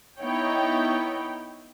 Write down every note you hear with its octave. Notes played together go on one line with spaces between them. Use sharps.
B3 D#4 E4 C#5 G5